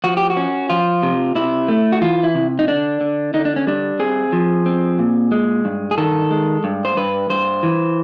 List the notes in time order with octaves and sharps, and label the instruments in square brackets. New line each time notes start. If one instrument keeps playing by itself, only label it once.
[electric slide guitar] F3 F#4
G4
F#4
C#4
F3 F4
C3
C3 E4
A3
F#4
E3 F4
E4
C3
D#4
D3 D4
D3
D3 D#4
D4
C#4
G3 D4
C4 G#4
F3
C4
A#2
G#3
G2
G#4
D#3 A4
G#3
G2
C5
G2 B4
G2 C5
E3